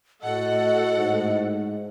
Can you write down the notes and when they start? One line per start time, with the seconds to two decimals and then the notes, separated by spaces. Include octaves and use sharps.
0.22 A2 F#4 A4 D#5 F#5
0.98 G#2